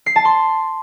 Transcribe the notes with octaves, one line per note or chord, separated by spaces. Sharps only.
C7
A5
C6